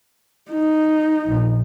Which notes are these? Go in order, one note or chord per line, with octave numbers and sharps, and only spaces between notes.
D#4
A#1